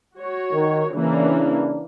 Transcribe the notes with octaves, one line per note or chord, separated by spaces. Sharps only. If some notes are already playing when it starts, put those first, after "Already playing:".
F#4 C#5
D#3
C#3 E3 A#3 C#4 D4